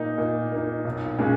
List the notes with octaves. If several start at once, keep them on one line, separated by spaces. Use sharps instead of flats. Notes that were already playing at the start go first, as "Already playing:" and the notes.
Already playing: A#2 A#3 D#4
A#2
A#3 D#4
B1
A#2 G#3 C#4